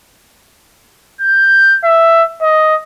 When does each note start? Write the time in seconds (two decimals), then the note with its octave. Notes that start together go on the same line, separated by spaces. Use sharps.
1.21 G6
1.84 E5
2.42 D#5